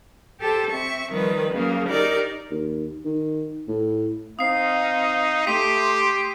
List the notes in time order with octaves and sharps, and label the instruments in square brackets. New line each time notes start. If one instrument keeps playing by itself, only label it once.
[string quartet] G4 A4 C5
C4 E5 C#6
D#3 F3 G3 B4
C#3 F#3 A#3
D#4 G4 A#4 D5
[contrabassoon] D#2
D#3
A2
[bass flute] C4 [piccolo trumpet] D#4 [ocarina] F5 [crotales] D#6 C7
[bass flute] A3 [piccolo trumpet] G4 [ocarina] C6 [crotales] D#6 B6 D#7